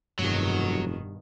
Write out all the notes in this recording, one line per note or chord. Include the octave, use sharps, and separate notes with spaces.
F1 G2 B2 D#3 F#3